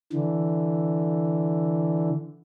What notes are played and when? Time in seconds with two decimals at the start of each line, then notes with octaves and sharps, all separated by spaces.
0.13 D3 E3